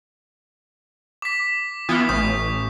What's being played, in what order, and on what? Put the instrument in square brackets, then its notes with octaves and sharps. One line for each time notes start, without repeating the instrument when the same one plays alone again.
[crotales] D6 B6
[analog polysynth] E3 B3 F4 [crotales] D6 D#6
[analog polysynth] A1 [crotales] C#6 D#6 G6